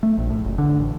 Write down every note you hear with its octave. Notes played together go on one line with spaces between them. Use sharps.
A3
A#1
A2
F#1
D3
A1